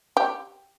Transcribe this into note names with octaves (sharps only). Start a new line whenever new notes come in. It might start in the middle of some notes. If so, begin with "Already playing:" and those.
G4